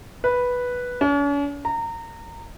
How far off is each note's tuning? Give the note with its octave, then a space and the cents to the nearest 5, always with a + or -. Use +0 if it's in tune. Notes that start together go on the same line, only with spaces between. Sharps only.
B4 -5
C#4 +45
A#5 -25